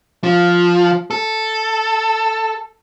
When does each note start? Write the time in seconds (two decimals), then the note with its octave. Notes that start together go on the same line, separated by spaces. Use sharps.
0.24 F3
1.11 A4